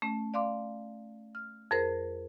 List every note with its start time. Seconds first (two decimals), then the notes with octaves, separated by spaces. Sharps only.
0.02 A3 C#4
0.34 D5 F5 C6 D6
1.35 F6
1.71 F2 G#4 A#4 C5 A#6